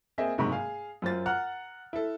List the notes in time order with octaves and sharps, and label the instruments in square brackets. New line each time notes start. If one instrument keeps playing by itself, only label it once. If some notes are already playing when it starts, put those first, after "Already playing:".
[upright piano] A#3 C4 G#4 D#5 E5
F#1 G#2 C3 D#5 B5 C#6
G#4 F5
F#2 F4 C5 A6
F#5 A#5 F6 F#6
E4 A4